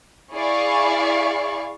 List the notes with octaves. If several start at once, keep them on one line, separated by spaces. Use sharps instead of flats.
E4 G#4 D5 F5 C#6